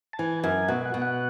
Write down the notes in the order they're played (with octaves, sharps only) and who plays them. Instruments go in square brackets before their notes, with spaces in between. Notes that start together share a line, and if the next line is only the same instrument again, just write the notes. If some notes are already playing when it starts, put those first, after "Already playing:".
[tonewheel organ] A5
[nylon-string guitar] E3 [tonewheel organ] G#5
[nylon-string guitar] F#2 [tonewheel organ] G#5
[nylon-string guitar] B2 [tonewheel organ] F#5
[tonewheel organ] F#5
[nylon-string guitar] B2
[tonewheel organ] F#5